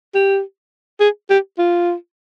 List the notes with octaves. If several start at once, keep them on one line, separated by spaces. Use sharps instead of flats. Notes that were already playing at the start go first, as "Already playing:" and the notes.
G4
G#4
G4
F4